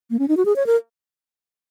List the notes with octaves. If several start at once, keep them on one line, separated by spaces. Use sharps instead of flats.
A#3
C#4
D#4
F#4
G#4
C#5
A#4